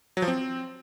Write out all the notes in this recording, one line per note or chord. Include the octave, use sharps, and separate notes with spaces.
F#3
F3
C4